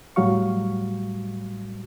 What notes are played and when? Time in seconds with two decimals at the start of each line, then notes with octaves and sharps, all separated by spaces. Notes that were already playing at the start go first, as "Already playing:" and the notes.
0.16 A2 F#3 G3 F#4 F5 C#6